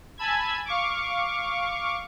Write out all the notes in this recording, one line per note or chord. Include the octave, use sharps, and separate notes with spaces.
G#5 A5 B5 E6 G#6
F5 C#6 D6